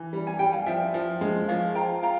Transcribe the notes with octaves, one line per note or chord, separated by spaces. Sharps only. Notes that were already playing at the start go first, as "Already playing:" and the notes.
Already playing: E3
G3
G#5
G3 G5
F5 G#5
F3 E5 G5
F3
G#3
F3 C#5 F5
F4 G5 A#5
F4 G5 A#5